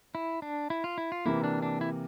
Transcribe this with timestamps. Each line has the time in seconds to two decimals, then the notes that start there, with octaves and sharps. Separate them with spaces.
0.15 E4
0.42 D4
0.70 E4
0.84 F4
0.98 E4
1.12 F4
1.25 C3 E3 A#3 E4
1.44 D4
1.62 D4
1.81 E4